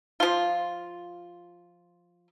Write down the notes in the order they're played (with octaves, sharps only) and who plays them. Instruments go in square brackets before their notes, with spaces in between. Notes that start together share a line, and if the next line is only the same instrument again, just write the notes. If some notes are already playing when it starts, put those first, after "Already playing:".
[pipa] F3 F4